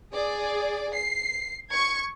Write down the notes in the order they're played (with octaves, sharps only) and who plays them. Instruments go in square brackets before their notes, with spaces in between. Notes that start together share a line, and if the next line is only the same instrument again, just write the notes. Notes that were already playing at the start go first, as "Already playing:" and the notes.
[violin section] G#4 D5
C7
C#6 G#6